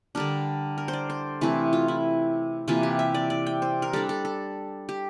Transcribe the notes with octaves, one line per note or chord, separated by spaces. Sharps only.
D3 G3 D4 A#4
A#4
C5
D5
C5
C3 E3 A3 C4
F4
E4
C3 E3 A#3 F4
G4
E5
D5
D5
G5
C5
A#4
G3 D4 A4
A4
A4
G4